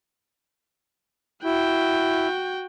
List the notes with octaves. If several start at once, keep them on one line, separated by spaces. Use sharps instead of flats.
E4 F#4 G5